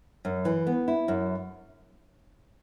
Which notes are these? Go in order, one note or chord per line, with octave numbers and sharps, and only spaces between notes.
F#2
E3
B3
E4
F#2